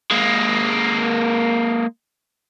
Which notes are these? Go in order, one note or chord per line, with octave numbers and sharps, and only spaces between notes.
G#3 A#3